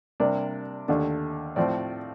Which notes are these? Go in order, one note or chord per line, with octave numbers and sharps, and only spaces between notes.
C3 G3 A#3 D4 D5
D#2 D3 A3 D4
A2 F3 C4 D5